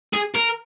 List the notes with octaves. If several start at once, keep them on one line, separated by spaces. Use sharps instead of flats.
G#4
A#4